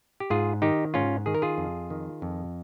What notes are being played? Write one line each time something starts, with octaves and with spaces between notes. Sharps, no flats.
G4
G#2 F4 G#4
D#3 D#4 G4
G#2 C#4 F4
D#3 G#4
A#4
F4 G#4
F2
D#3
F2